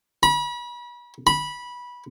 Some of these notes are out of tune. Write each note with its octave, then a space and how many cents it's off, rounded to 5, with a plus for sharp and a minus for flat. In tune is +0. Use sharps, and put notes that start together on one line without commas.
B5 -35
B5 -15